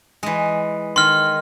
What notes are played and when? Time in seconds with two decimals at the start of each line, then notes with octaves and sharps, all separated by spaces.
0.23 E3 G#3
0.96 D#3 C6 F6